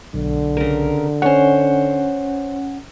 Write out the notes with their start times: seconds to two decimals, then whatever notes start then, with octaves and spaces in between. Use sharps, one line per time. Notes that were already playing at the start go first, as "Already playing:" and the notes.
0.14 B1 D3
0.57 C#3 A#4
1.22 C#4 C5 C#5 F#5